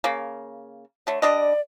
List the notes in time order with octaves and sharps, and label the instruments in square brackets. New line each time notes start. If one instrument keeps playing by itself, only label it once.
[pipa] C#3 A#3
[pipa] D3 A3 [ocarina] C#5
[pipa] G3 D4 D#5 [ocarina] D5